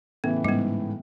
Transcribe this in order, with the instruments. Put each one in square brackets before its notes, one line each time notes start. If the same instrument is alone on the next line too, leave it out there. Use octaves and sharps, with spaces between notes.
[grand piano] A2 C#3 E3 [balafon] B3
[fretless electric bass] G#2 [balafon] G3 B3